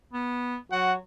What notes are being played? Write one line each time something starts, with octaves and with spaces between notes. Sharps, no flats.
B3
F#3 F#4 F#5